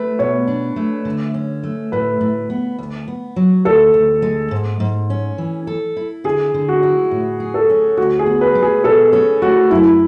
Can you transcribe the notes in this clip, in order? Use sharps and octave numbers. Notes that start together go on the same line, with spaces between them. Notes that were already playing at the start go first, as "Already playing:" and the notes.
Already playing: A3 B4
B2 C#5
D4
A3
D3
C#4
A3
A2 B4
A2
B3
D2
B3
F#3
D2 A4
D2
G#3
G#2
G#2
C#4
E3
A4
E4
D3 G#4
D3
F#4
E4
A2
G#4
A4
C#4
D2 F#4
G#4
B3
B4
G#3
G#4
B2 A4
C#4 G#4
A3 F#4
F#2 E4